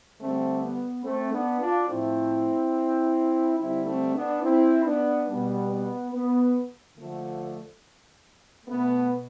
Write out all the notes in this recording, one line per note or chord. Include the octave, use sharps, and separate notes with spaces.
D3 G3 A3 C4
B3
A3 C4
B3 D4
D4 F4
A2 F3 A3 C4 E4
D3 G3 C4 E4
A3 C4
B3 D4
C4 E4
B3 D4
B2 G3 B3
B3
B3
D3 F3 A3
B2 A3 B3